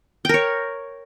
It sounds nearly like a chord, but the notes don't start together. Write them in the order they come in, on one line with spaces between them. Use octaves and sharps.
G5 A#4 C#5